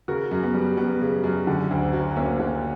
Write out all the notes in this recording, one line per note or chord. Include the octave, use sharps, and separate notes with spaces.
C#3 F#4 A#4
F#2
B3
G3
F#2 B3
C#3
F#2
D3
D2
F#3
D2 A#3 C#4
D3